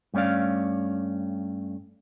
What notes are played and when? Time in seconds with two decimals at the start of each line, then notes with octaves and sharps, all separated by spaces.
0.14 G2 A3 C#4 D5 F5